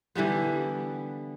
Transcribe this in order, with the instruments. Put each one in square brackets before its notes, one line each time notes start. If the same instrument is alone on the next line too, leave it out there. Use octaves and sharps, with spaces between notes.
[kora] D3 E3 G3 B3